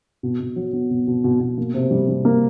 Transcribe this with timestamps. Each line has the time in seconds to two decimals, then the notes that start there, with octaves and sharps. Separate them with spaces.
0.23 B2
0.40 B2
0.56 F#3
0.73 B3
0.90 B2
1.07 B2
1.24 B2
1.40 B2
1.58 A#3
1.74 C3
1.91 G3
2.08 G3
2.25 A#3